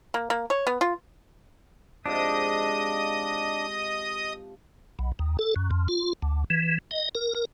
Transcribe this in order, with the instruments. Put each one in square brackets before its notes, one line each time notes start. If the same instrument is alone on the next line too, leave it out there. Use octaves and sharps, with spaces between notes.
[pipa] A#3
A#3
C#5
B3
F4
[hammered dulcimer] G#2 C3 F3 [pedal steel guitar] D4 [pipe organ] D#5 D#6
[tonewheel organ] B1
D#2
A4
F#2
F2
F4
D2
E3
D#5
A#4
A#4